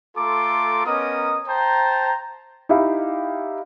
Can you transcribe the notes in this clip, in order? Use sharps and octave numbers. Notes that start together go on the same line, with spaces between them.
A3 F4 A4 A#5 C6 D6
B3 C#4 A#4 D#5 A#5 D#6
C5 G5 A5 A#5
D#4 E4 G4 E5 F5